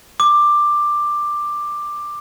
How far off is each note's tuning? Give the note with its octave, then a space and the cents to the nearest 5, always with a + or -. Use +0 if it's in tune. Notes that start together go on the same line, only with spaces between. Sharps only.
D6 +10